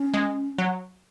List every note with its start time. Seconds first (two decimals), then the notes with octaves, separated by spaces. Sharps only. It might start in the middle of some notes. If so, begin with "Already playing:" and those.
Already playing: C#4
0.14 G#3
0.58 F#3